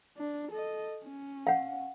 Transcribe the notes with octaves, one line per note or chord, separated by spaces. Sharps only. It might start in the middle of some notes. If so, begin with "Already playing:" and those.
D4
A4 D#5
C#4
F5 F#5